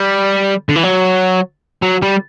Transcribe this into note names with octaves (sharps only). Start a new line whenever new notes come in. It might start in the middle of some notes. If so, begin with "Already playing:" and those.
Already playing: G3
D3
E3
F#3
F#3
G3